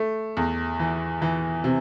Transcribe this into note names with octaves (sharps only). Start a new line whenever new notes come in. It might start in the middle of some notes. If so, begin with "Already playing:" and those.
Already playing: A3
E2
E3
E3
C3